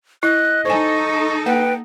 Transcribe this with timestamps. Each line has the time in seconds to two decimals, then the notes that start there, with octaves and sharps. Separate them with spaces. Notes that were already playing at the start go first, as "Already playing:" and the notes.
0.23 E4 D#5 F#6
0.65 D#4 A4 C5 G#5 C#6
1.46 A#3 B4 F#5 G5